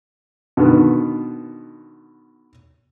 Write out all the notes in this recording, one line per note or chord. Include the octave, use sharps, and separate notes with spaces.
B2 D3 D#3 B3